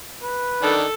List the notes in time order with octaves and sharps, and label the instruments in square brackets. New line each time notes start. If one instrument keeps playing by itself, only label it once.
[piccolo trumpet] B4
[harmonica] D#3 D4 [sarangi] A4